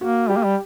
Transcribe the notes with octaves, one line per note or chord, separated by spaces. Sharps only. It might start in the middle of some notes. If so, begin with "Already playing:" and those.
A#3 F#4
G3 G4
A#3
G3